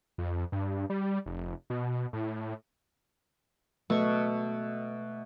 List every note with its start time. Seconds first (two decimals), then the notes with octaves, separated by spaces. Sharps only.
0.18 F2
0.52 G2
0.90 G3
1.26 F1
1.70 B2
2.13 A2
3.90 B2 A3 C#6